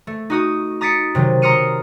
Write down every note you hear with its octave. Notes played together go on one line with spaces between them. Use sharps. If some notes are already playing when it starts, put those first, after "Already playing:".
A3
D#4 F#4 D#6
A#5 D#6 A6 B6 C#7 D7
C3 D#3 F#3
A#5 C6 D#6 F6 C#7 D#7